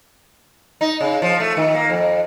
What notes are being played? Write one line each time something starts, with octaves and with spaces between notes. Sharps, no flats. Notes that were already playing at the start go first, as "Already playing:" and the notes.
D#4
C#3
F3
A3
D#3
A#3
F2